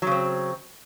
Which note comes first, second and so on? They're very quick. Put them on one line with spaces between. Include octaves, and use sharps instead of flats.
F#3 C#3 C4